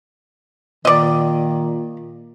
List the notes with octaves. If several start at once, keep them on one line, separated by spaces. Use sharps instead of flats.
A#2 D#3 D5 D#5